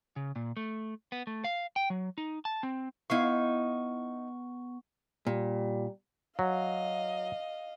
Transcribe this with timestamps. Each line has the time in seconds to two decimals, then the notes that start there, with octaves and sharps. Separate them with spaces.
0.16 C#3
0.36 A#2
0.57 A3
1.12 B3
1.27 A3
1.44 F5
1.76 G5
1.90 F#3
2.18 D#4
2.45 A5
2.63 C4
3.10 B3 D#4 E4 F5 C#6
5.27 A#2 G3
6.39 F#3 D#5 F5